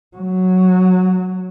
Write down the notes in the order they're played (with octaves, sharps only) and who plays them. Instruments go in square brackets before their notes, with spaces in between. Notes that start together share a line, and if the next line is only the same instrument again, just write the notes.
[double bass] F#3